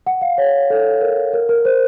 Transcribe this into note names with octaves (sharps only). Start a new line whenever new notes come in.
F#5
F5
C#5
A4
A#4
A#4
A#4
C5